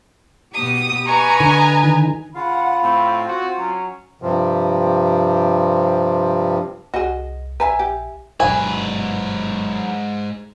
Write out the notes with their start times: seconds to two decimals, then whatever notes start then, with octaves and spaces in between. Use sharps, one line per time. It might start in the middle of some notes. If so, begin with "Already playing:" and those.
0.54 B2 G4 D#6
1.07 B4 D#5 G#5 A#5 C#6
1.40 D3
1.84 D#3
2.35 C#3 F4 F5 F#5 B5
2.82 A2 C4
3.28 F#4
3.58 F#3 C#4
4.22 G2 C3 F3
6.94 C2 F#4 G#4 D#5
7.60 A#1 B4 E5 G#5 A#5
7.79 G4
8.40 G1 G#2 B2 F#3 B4 G#5